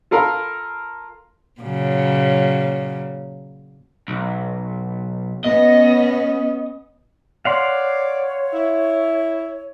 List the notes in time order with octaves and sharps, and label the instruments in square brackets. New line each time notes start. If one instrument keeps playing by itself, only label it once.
[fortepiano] F4 A4 A#4 F5 B5
[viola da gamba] A#2 C#3 F#3
[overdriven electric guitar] B1
[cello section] B3 C#4 [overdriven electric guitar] D#5
[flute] C#5 [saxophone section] D5 [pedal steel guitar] F5 F#5 C6
[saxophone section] E4